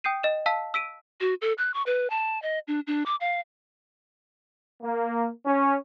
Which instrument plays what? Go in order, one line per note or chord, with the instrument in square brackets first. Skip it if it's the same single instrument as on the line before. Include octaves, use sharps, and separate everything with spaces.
[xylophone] G5 D#6 G6 C7 D#7
D#5 E7
F5 A5 E6 B6
E6 B6 D7 D#7
[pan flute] F#4
A4
F#6
C#6
B4
A5
D#5
D4
D4
D6
F5
[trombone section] A#3
C#4